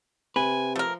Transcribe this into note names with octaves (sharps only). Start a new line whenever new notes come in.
C3 B4 G#5
F3 A3 A#4